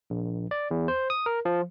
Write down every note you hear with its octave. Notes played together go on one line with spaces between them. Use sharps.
A#1
D5
E2
C5
D#6
A#4
F3